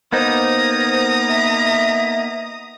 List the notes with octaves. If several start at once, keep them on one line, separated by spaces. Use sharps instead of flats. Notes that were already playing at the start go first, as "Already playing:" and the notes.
A#3 B3 D#4 C5 A#5 D#6
E5